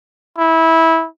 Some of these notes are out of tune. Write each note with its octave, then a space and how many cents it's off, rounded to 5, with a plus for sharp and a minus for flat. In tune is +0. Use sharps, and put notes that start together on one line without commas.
E4 -20